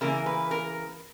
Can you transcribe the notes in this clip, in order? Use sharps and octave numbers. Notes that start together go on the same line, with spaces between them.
C#3 E3 A#3 A#4
B4
A#4